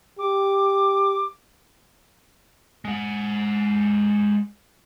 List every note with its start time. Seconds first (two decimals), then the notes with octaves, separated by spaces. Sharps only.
0.19 G4 D6
2.85 G#3 F#5